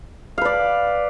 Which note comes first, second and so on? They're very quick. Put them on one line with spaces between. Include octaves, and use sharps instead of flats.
F5 B4 D5